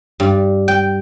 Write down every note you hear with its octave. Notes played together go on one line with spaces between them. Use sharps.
G2
G5